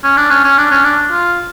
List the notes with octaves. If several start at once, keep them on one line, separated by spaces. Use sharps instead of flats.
C#4
D4
C#4
C#4
D4
C#4
D4
F4